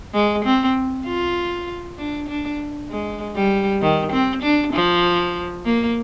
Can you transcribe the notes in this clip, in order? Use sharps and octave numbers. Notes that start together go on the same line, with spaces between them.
G#3
C4
F4
D4
D4
G#3
G3
D#3
C4
D4
F3
A#3